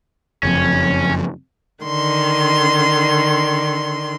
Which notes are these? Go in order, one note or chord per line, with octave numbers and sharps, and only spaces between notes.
F#1 F2 C#4
D3 D#3 C6